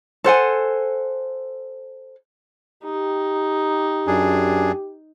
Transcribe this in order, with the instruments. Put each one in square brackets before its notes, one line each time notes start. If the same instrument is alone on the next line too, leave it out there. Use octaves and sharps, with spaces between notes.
[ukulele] A4 C5 F#5 G#5
[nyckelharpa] D#4 [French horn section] G4
[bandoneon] F#2 D4 G#4